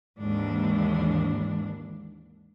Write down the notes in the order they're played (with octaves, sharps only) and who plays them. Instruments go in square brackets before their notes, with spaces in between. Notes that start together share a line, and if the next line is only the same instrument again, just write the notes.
[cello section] D#2 G#2 E3 D4